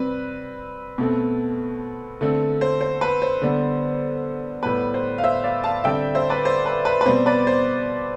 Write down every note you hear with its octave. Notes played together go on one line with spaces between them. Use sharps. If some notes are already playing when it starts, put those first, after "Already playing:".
Already playing: C3 G3 C4 B4
B2 A3 C4
D3 A3 C4
C5
C5
B4
C5
D3 G3 B3
A2 G3 B3 B4
C5
F5
C5 E5
D5 F5
F5 A5
D3 G3 C4 E5 G5
C5 E5
B4 D5
C5
B4
B4
B4
B2 G3 C4 C5
B4 D5
C5